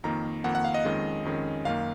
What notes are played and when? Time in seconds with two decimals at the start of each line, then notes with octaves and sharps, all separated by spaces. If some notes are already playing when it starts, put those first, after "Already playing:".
0.04 F2 D#3 A#3 A#5
0.44 F2 D#3 A#3 F#5
0.55 F#5
0.64 F5
0.74 D#5
0.85 F2 D#3 G#3 C#4
1.25 F2 D#3 G#3 C#4
1.65 F#2 D#3 A#3 D#4 F5